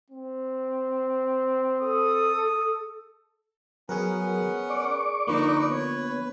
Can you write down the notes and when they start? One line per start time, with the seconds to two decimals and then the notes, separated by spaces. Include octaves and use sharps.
0.11 C4
1.81 A4 D#6
3.89 F#3 B3 C#4 G#4 A#4 F#5
4.70 D5 C#6 D6
5.27 D3 F3 A#3 D#4 B4
5.70 B3 C#5